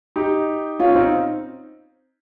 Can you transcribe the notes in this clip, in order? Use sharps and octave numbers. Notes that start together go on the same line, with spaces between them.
D#4 G4
C#4 F4
C4 D#4